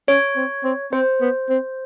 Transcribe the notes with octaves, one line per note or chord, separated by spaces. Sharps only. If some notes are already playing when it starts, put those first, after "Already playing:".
C#4 C#5
C4
C4
C4 C5
B3
C4